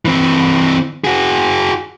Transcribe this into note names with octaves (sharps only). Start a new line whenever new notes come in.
E3 C4
F#4 G#4